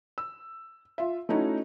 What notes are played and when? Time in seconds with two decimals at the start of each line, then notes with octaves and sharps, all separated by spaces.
0.18 E6
0.98 F4 E5
1.29 A3 C#4 D#4 E4 F#4